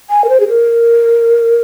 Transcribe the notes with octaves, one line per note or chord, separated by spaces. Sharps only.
G#5
A#4
C5
G#4
A#4